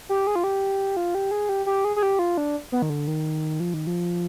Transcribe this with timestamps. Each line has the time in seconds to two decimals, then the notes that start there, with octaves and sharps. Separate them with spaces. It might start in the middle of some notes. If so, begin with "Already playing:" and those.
0.09 G4
0.27 G#4
0.35 F4
0.44 G4
0.97 F4
1.15 G4
1.31 G#4
1.49 G4
1.66 G4
1.85 G#4
1.96 G#4
2.03 G4
2.19 F4
2.37 D4
2.72 B3
2.82 D#3
2.90 D3
3.08 D#3
3.60 F3
3.74 D#3
3.87 F3